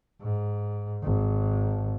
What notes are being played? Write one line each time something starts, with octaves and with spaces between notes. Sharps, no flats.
G#2
G#1